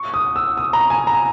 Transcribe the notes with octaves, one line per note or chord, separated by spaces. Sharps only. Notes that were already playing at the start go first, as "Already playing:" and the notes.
Already playing: C#6
D#6
E6
D#6
A#5
G#5
A#5